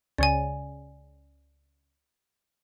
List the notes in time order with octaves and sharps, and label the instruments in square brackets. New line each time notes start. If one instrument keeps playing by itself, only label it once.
[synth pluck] C#2 C#3 [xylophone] D5 G#5